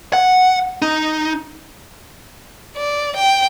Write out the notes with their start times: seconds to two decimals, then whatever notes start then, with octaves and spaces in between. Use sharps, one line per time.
0.13 F#5
0.82 D#4
2.76 D5
3.16 G5